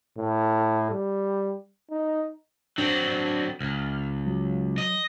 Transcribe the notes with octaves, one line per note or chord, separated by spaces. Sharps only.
A2
G3
D#4
F#3 C4 D4
C#2 F6
F#3
D#5